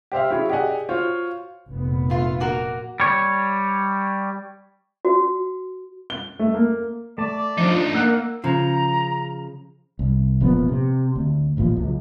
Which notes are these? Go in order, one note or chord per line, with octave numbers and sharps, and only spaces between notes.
G4 C5 E5 F5
F#3 C#4 E4 G#4 C#5
G4 G#4 D5 D#5 F#5 G#5
F4 F#4 C5 C#5
F1 A#2 B3
A3 F4
A#3 F#4 A#4
G3 C#5
F#4
G7
A3
A#3
A3 D5 A5
F3 D4 D#4
A#3 F#5 E6 F#6
C#3 F3 A#5
C2
E1 A#2 F3 B3
C3
D2
D1 A1 A#2 F3
C#2 F#3